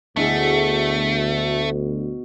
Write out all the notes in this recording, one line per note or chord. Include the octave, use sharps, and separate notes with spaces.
D2 B2 A3 D4 E4 G#4